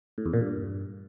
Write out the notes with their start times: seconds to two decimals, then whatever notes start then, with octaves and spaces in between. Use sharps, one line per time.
0.18 A2
0.26 E2
0.33 A#2
0.41 G2